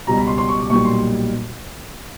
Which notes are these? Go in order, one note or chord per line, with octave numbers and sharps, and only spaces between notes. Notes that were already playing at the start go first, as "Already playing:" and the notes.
C#2 B2 G3 A#5
B5
C6
C6
C#6
D6
B1 A#2 G3 C#6
C6